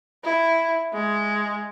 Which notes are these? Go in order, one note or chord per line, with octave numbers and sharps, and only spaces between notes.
E4
G#3